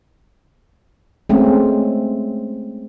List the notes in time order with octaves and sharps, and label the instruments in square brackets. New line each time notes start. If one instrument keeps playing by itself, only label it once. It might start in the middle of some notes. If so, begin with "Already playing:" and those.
[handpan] G#3 A3 C4 C#4